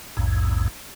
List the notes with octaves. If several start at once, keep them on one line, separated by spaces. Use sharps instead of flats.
A#1 E2 G#2